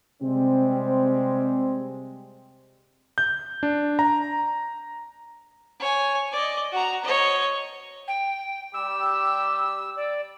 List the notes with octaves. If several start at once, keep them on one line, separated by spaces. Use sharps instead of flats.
C3 G3 G#3 C4
G6
D4
A#5
C#5 G#5
D5 D#5
F#4 A#5
C#5 D#5
G5
G3 G4 E6
D5